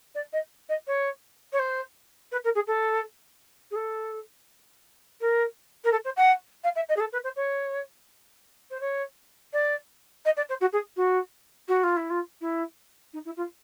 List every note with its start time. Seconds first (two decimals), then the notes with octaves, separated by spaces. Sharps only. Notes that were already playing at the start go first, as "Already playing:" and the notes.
0.15 D5
0.33 D#5
0.69 D#5
0.87 C#5
1.52 C#5
1.59 C5
2.31 B4
2.44 A#4
2.55 G#4
2.67 A4
3.71 G#4
3.75 A4
5.20 A#4
5.84 A#4
5.92 A4
6.04 C5
6.16 F#5
6.63 F5
6.75 E5
6.88 D#5
6.96 G#4
7.00 A4
7.12 B4
7.24 C5
7.36 C#5
8.70 C5
8.80 C#5
9.53 D5
10.25 D#5
10.36 D5
10.49 C5
10.60 F#4
10.72 G#4
10.96 F#4
11.68 F#4
11.83 F4
11.96 E4
12.10 F4
12.41 E4
13.13 D#4
13.25 E4
13.36 F4